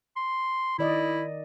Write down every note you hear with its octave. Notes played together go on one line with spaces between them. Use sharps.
C6
D#3 E4 D5 D#5